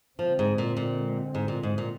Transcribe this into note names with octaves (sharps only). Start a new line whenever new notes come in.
D3 F3 G#3 C4
G#2
A#2
A#2
G#2
A#2
G#2
A#2